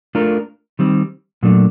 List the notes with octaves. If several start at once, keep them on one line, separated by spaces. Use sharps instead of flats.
A3 D4 F4 A#4
D#3 G3 C4
A#2 F#3 A3 D4